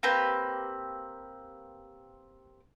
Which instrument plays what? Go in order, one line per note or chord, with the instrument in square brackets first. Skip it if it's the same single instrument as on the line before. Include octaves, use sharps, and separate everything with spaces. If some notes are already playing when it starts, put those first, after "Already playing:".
[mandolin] A#3 C4 G4 B4